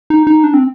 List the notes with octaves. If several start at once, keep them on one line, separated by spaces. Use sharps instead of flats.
D#4
D#4
D4
C4